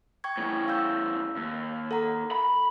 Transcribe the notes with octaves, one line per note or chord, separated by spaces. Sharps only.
G5 C#6 G#6
E2 A2
F5 E6 G6
D#2
A4 F#5 A#5
B5